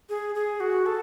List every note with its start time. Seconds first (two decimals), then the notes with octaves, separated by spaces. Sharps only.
0.09 G#4
0.35 G#4
0.60 F#4
0.86 A4